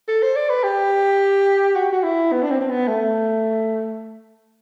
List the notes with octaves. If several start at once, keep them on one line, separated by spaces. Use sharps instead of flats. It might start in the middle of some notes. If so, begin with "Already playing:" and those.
A4
C5
D5
B4
G4
F#4
F#4
E4
B3
D4
C4
C4
B3
A3